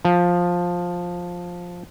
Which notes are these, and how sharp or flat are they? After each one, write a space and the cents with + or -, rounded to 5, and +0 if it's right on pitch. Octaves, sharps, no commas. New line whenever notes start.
F3 +10